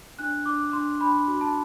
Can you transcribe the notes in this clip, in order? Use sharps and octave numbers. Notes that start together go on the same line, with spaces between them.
D4 F#6
D4 D6
D4 C6
D4 B5
F#4
A5